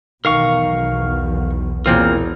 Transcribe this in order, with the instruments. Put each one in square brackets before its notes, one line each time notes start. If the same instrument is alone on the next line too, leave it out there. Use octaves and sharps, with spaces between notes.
[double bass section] B1 E2 B2 [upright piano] D#3 [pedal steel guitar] A#4 F5 C#6
[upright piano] E1 E3 [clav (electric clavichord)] A#2 C4 F4 [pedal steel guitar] A#4